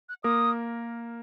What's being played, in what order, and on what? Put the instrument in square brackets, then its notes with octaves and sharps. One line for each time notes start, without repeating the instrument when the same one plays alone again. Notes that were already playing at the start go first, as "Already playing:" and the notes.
[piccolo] F#6
[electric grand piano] A#3 A#4 [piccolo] D#6